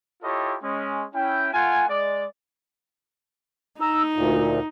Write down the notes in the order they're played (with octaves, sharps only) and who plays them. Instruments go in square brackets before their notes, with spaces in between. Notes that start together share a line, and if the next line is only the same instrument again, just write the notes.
[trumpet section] E4 F4 G4 A4 C#5 D#5
G#3 C#4
C#4 E4 G5
A3 F4 F#5 G#5
G#3 D5
[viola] D#4 [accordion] A#5 E6
[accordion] D2 A#2